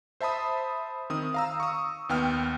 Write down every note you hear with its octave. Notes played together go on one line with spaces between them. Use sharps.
C5 E5 A5 B5 D#6
D#3 C4 D#6
F5 A#5 E6
C#6 D#6
D#2 B3 G5 F6